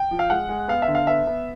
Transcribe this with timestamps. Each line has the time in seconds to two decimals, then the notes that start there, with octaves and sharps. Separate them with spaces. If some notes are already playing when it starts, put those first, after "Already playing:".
Already playing: G5
0.11 F3
0.19 F5
0.30 G#3 F#5
0.49 G#3
0.68 B3 F5
0.82 E5
0.88 D3
0.95 F5
1.07 B3 E5
1.27 B3